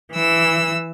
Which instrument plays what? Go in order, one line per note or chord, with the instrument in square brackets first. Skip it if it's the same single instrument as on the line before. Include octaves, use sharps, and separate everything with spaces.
[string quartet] E3 E6